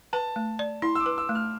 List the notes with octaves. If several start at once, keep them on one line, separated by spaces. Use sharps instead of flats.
B4 A5
A3
D5
E4 C6
E6
D6
B4
E6
A3
F6